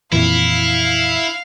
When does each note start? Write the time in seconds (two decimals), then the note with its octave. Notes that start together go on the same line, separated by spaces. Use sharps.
0.12 F2 A#2 E3 E4 F5